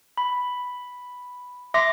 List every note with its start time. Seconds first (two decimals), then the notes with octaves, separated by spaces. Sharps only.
0.18 B5
1.74 E5 C6 D6 A#6